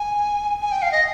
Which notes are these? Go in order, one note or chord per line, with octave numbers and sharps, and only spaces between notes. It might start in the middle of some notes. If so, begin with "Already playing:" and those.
Already playing: G#5
G#5
G5
F5
D#5